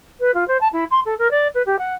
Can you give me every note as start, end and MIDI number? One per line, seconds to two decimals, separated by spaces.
0.20 0.31 71
0.34 0.47 65
0.48 0.58 72
0.61 0.68 81
0.73 0.84 64
0.91 1.00 84
1.06 1.15 69
1.19 1.30 70
1.31 1.48 74
1.55 1.62 71
1.66 1.76 67
1.79 1.95 78